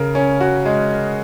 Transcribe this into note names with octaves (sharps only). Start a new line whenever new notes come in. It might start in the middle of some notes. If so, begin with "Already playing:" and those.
Already playing: C#3 A#4
C#4
F#4
G#3